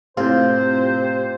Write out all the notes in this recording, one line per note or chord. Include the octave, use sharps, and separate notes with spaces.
A2 C3 C4 F4 C5